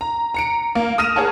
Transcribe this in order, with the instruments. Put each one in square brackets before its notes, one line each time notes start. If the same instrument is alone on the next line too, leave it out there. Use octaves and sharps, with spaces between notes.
[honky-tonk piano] A#5
A#5 C#7 D7
A#3
D#6 F6 A#6 D#7 E7
G#4 A#4 C#5 F#5 A5